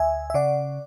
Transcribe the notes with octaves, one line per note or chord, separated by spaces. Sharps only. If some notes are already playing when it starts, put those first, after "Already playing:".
Already playing: D2 E5 G#5
E5
C#3 D5 F#5